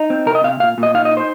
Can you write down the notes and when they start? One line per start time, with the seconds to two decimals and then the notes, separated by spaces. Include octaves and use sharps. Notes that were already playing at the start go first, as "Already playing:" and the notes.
Already playing: D#4
0.10 C4
0.26 C3 A#4
0.35 D#5
0.44 C3 F5
0.60 A#2 F5
0.78 A#2
0.83 D#5
0.94 D#4 F5
1.05 D#5
1.11 D#4
1.17 C5